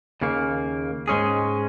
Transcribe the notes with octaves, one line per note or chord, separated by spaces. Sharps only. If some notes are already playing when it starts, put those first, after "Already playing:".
D#2 C#3 A#3
G#2 G#3 C#4 G#4